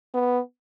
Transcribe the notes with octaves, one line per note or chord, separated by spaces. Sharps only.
B3